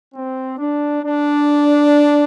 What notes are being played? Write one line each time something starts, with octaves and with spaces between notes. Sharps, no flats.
C4
D4
D4